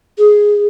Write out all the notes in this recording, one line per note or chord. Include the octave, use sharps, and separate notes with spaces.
G#4